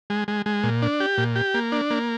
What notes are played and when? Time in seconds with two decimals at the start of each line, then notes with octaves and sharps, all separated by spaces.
0.10 G#3
0.28 G#3
0.46 G#3
0.63 A#2
0.82 D4
1.00 G4
1.18 A#2
1.36 G4
1.54 A#3
1.72 D4
1.91 A#3